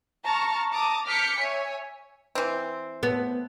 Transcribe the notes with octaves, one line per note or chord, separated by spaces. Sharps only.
A5 A#5 C#6 F6
A5 A#5 D6 D#6
D6 F6 G6 B6 C#7
C#5 E5 G#5
E3 C4
B3